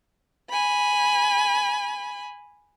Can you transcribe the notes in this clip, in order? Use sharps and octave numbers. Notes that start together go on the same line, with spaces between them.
G#5 B5